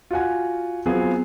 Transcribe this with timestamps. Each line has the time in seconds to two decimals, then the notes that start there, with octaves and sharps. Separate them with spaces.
0.11 F4 F#4 F#5 G#5
0.86 F#3 B3 C4 F4 G#4